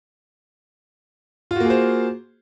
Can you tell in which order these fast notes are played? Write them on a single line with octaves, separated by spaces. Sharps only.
F4 F#4 A#3 G#4 C5